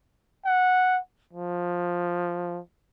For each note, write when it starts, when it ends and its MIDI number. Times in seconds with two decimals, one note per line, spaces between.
0.46 0.99 78
1.33 2.60 53